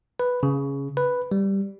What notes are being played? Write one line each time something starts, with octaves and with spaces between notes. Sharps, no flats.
B4
C#3
B4
G3